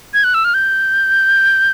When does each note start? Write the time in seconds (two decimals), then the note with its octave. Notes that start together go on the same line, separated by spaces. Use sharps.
0.14 G#6
0.24 F#6
0.34 E6
0.45 F6
0.54 G6